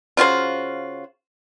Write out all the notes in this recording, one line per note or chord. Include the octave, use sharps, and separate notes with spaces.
C#3 F4 F#4 C5